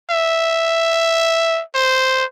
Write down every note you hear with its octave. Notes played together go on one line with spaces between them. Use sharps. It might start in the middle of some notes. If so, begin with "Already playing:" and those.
E5
C5